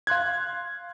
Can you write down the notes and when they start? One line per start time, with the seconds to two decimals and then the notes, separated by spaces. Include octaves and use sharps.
0.07 F5 C6 F#6 G#6